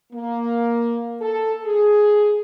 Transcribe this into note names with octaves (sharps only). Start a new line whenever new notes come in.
A#3
A4
G#4